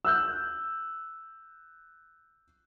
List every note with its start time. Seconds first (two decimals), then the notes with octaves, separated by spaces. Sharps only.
0.05 E6 F#6 G6